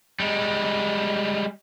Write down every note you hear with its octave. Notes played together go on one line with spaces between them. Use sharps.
G3 G#3